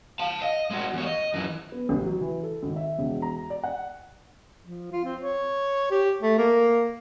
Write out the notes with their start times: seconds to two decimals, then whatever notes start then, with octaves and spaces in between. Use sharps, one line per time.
0.19 F5 A5
0.42 D#5
0.71 G#3 F#4
0.93 E2 C#5
1.06 D#5
1.34 F#2 E3
1.72 B3
1.89 A1
2.03 F#3
2.21 E3
2.43 A4
2.63 G#1
2.76 E5
2.99 E1
3.22 A#5
3.50 D5
3.63 F#5
4.64 F3
4.92 F4
5.04 C4
5.22 C#5
5.91 G4
6.23 A3
6.38 A#3